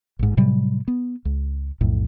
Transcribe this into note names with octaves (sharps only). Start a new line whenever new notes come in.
A1 G#2
A2 C3 F#3 G3
B3
C#2
B1 F2 A2